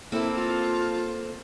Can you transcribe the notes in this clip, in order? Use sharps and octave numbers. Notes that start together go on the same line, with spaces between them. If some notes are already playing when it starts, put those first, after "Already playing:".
A#3 C4 E4 A4
F4